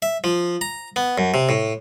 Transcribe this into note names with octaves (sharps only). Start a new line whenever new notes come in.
E5
F3
A#5
B3
F#2
C3
A2